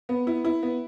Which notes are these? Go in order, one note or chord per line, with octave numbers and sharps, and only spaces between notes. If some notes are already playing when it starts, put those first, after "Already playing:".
B3
E4
E4
B3